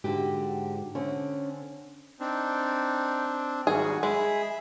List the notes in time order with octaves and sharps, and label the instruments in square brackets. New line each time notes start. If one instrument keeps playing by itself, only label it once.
[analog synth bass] G#2 [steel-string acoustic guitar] D3 F#4 G4
[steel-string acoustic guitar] D3 C4 [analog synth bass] C#4
[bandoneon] C4 D4 [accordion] D#4
[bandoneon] G#2 D#3 G3 [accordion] F#4 [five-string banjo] G#4
[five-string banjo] G#3 [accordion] G#4 [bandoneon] E5 B5